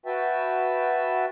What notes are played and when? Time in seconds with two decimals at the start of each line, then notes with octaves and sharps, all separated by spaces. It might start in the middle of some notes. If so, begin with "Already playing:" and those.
0.06 F#4 B4 E5 G5 A5